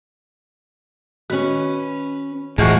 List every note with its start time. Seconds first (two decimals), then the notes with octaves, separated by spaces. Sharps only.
1.30 D#3 C#4 F#4 B4
2.58 D1 F2 A2 E3 G#3 A3 F4 F#4